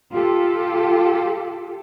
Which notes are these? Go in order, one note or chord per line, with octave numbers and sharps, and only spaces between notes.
F4 G4 A4